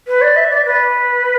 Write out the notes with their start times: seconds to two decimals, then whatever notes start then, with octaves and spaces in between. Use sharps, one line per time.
0.07 B4
0.21 D5
0.36 E5
0.50 D5
0.65 B4